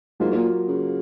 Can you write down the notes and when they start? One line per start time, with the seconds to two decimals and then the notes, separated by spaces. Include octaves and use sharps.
0.20 G#2 F#3 A#3 F4
0.31 G#2
0.37 A#2
0.68 C#3